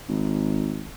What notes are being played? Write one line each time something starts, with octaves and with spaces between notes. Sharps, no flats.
G#1